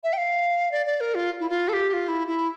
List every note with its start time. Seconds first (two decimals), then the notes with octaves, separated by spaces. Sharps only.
0.04 E5
0.13 G5
0.18 F5
0.71 D5
0.86 D5
1.00 A#4
1.15 F4
1.40 E4
1.49 F4
1.68 A4
1.73 G4
1.89 G4
1.93 F4
2.08 E4
2.27 E4